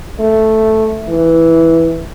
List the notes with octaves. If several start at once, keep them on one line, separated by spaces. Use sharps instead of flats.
A3
E3